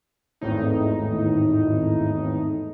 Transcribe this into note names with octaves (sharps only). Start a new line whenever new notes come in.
G#1 E2 A2 D#4